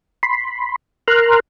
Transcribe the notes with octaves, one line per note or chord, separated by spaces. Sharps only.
B5 C6
A#4 A#5 C6 F6 F#6